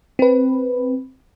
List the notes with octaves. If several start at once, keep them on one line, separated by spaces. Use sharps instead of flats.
C4 B4